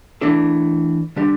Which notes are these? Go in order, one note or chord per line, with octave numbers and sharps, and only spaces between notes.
E3 A3 D4 A4
D3 G3 D4 G4